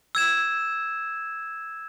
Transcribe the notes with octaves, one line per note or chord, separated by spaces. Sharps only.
E6 G#6 E7